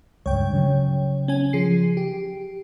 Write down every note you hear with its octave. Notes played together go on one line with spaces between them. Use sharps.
C#2 G2 C#5 G5
C#3 F#3
C#4 G#5
F3 G#4 C7
G4